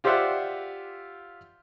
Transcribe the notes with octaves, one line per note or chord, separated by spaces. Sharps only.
F4 G4 C5 D5 E5 F#5